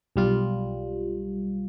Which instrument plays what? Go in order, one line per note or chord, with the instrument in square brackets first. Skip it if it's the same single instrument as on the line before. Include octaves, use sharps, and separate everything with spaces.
[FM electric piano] B1 G3 F4